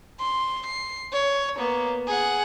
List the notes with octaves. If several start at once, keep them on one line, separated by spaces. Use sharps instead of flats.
C6
C7
C#5
A#3 B3
G#4 F#5